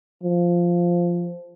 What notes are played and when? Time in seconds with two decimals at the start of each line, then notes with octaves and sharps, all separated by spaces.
0.23 F3